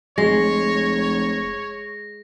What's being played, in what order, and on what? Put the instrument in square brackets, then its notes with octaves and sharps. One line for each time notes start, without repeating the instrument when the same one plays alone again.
[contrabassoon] F1 [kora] G#3 [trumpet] C#5 [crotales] A#6